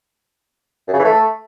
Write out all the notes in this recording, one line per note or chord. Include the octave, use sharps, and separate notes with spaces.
F#2
C#3
E3
A3